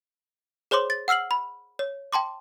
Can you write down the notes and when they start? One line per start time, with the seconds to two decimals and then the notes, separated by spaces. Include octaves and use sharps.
0.71 G#4 C5 C#5 C6 D6
0.90 A6
1.08 F#5 E6 F6 C7 F#7
1.31 B5
1.79 C#5
2.13 G5 A5 C6 D6